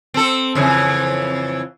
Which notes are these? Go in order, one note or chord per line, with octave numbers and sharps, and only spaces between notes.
C4 A4
F2 C#3 E3